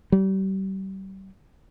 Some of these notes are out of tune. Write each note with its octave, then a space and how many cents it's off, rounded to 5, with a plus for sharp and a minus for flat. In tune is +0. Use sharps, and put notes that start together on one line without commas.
G3 -35